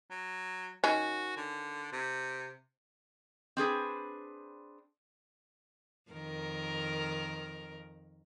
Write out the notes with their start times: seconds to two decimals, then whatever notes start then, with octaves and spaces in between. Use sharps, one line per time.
0.11 F#3
0.84 D#3 C#4 F#4
1.37 D3
1.92 C3
3.57 C4 D4 G#4 B4
6.11 F2 D#3 A#4